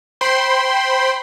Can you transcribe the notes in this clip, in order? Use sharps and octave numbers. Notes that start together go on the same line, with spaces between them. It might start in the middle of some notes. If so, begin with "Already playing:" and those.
C5 G5 B5 C6